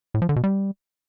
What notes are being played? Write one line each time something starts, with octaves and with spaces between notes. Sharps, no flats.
A2
F3
D3
B2
G3